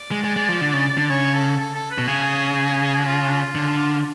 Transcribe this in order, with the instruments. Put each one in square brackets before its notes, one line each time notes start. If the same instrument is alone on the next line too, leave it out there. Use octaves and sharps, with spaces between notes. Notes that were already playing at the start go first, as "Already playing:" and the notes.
Already playing: [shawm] D5
[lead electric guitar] G#3
G#3
G#3
F3
D3
C#3
D3
[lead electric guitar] C#3 [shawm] C#5
[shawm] A4
A4
A4
B4
[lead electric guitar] B2
[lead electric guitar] C#3 [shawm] G#4
[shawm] F#4
F4
D4
F4
[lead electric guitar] D3